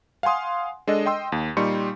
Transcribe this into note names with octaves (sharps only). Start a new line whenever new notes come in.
F5 F#5 G#5 C6 D#6
G#3 D4 A4 D#5
D#5 G5 C6 E6
D#2
A#2 G3 D#4 C6 C#6 C#7